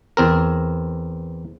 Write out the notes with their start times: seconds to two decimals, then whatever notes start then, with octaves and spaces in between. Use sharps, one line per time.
0.17 E2 C4 A#4